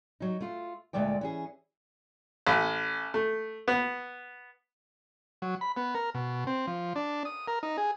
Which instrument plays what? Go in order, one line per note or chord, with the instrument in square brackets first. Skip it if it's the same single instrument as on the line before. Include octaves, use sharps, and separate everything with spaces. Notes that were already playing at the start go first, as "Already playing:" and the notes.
[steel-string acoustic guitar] F#3 D#4
A3 F4
D2 A#2 G#3 A3 D5 G5
E3 C#4 G#4
[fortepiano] A1
A3
B3
[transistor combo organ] F#3
B5
B3
A#4
B2
C4
F3
D4
D#6
A#4
D#4
G#4